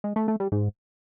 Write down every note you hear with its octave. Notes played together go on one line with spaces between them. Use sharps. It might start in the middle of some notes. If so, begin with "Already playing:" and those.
G#3
A3
A3
G3
G#2